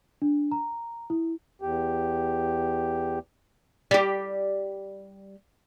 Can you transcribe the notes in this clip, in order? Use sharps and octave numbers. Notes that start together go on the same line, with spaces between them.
D4
A#5
E4
E2 G4
G3 G4